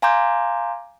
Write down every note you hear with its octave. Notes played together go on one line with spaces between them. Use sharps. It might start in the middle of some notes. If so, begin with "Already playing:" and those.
F5 G#5 A#5 C6 D6 G6